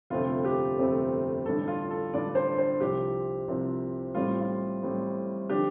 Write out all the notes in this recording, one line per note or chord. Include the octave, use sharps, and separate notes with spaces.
G1 F2 C3 A3 C4 F4
G4
G1 F2 C3 A3 C4
A1 G2 D3 A4
F4
A4
A1 G2 D3 D5
C5
C5
C2 C3 F3 C4 G4
C2 C3 F3 C4
A1 A2 G3 C4 F4
F4
A1 A2 G3 C4
D3 F3 D4 G4